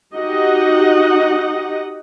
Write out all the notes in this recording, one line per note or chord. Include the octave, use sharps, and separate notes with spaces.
D#4 F#4 G4 D#5 F#5